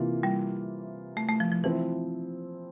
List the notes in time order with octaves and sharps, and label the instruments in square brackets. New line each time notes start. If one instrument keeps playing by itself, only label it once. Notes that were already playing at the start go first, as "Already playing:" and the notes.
Already playing: [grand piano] C3 E3 A#3 F4
[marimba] G3
A3
A3
F3
F3
[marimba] E3 [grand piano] F3 C4 E4